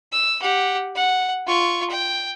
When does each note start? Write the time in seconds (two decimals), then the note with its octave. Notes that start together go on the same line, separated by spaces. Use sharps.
0.12 E6
0.41 G4 F#5
0.95 F#5
1.47 F4 C#6
1.90 G5